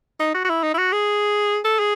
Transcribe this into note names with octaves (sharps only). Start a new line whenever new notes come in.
D#4
F#4
F#4
E4
D#4
E4
F#4
G#4
A4
G#4